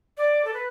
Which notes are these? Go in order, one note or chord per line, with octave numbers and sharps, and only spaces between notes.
D5
A4
B4